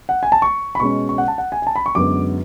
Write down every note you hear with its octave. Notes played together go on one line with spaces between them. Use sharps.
F#5
G#5
A5
C#6
B5
B2 G#3 C#4 C#6
C#6
F#5
A5
F#5
G#5
G#5
A5
B5
C#6
F#2 D3 G#3 B3 D6